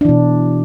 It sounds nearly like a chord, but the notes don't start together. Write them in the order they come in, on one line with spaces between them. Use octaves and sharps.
D4 E3 B2